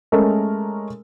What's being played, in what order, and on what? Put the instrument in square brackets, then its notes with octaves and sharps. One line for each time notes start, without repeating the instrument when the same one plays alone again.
[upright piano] G#3 A3 C#4 A4 A#4